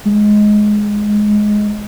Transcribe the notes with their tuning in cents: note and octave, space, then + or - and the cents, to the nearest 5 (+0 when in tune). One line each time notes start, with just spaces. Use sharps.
G#3 +10